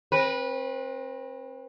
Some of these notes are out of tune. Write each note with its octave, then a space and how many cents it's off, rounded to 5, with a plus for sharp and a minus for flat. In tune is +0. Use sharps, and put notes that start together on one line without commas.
C4 +30 B4 -20